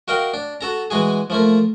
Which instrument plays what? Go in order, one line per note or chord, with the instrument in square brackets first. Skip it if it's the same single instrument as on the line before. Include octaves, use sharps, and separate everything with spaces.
[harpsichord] F#4 A#4 D#5 F5 G5
D4
F#4 A4 A#5
E3 G#3 F#4 G#4
F3 A3 A#3